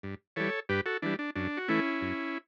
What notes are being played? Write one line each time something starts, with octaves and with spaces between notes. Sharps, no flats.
G2
E3 G3 A4 C#5
G2 G4 B4
F#4 A4
E3 G3 D4
D4
F#2 D4
F#4
E3 A3 C#4 E4
F#2